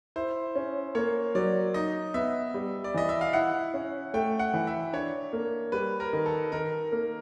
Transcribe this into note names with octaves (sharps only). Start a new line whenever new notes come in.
E4 C5
C#4
A#3 C#5
F#3 D5
D#4 D#5
B3 E5
G3
D5
E3 D#5
E5
F5
E4 F#5
C#4
A3 G5
F#5
E3
E5
D4 C#5
A#3
G3 B4
A#4
D#3
A4
D#3 A#4
A#3